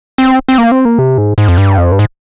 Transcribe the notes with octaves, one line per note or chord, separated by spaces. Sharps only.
C4
C4
A#3
C4
A#3
C3
G#2
G#2
F2
G2
F2
G2
G#2